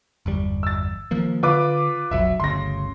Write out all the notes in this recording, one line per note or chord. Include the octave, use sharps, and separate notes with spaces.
G1 E2 G3
E6 A6
D#3 F3 A#3
D3 F4 B4 D6
F1 B1 F#3 E5
G1 D2 C#3 C6 A#6